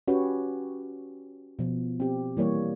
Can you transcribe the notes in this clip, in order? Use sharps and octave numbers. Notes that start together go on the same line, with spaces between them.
C#4 F#4 G4 B4 C#5
B2 F3
C4 G4
E3 G3 A#3 C#5